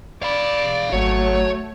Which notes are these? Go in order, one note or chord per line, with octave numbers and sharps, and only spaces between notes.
D5 F5 B5
G#1 F#3 A3 C#5